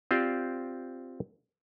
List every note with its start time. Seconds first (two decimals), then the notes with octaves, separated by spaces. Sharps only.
0.11 C4 F4 G4 C5 D5